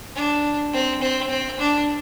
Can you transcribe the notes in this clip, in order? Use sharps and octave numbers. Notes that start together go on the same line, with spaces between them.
D4
C4
C4
C4
D4